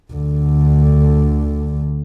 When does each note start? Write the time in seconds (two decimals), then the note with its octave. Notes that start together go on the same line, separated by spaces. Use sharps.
0.13 D2 D3